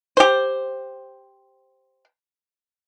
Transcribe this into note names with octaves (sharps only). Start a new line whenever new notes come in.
G4 C5